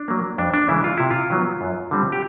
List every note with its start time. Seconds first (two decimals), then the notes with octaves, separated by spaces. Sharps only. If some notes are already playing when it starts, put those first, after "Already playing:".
Already playing: D4
0.08 F#3 A#3
0.38 F2 D4
0.54 D4
0.69 C#3 E3 G#3 E4
0.84 F4
0.97 C3 E4
1.11 F4
1.30 D#3 F#3 B3
1.61 F#2
1.91 D3 G3 C4
2.12 G4